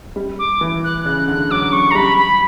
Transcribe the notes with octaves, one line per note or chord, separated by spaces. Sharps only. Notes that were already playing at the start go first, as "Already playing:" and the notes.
G3
D6
E3
F#6
C#3 F#6
D3 F#6
F#3 D6
F#3 C#6
A#5
G3 B5
B5